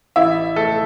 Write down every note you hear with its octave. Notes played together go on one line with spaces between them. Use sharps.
A1 E4 E5
A3 A4